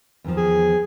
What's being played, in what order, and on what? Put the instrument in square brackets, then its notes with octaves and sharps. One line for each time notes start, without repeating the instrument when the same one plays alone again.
[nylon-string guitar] E2 D#3 F3
[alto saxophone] G#4